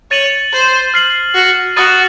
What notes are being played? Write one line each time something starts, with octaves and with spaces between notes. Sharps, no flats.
C#5 A6 D#7 F#7
C5
F6 C7 F#7
F#4
F#4 D#6 A6 D#7